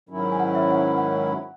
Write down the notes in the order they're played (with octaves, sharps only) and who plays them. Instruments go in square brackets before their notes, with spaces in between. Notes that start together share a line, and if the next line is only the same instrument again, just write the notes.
[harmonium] G#2 D#3 F#3 C#4 E4
[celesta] G#5
F#5
E5
F#5
F#5
F#5